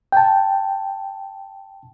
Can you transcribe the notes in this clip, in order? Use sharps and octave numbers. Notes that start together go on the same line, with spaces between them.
G5 A5